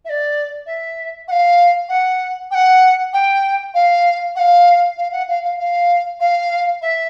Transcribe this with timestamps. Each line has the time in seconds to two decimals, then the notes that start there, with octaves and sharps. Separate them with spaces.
0.05 E5
0.10 D5
0.66 E5
1.28 F#5
1.31 F5
1.89 F#5
2.51 G5
2.55 F#5
3.13 G5
3.74 F5
4.36 F#5
4.39 F5
4.97 F5
5.12 F#5
5.29 F5
5.43 F5
5.59 F5
6.20 F5
6.82 E5